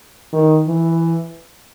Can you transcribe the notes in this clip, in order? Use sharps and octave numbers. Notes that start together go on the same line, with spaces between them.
D#3
E3